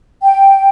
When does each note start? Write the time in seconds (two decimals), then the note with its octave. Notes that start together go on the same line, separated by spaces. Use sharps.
0.22 G5